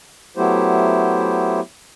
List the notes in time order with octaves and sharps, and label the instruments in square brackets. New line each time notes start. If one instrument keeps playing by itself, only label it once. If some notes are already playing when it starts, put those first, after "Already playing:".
[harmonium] F#3 A3 B3 E4 G4 C5